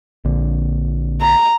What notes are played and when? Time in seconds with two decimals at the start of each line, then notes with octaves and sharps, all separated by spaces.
0.25 A#1 D3
1.21 A#5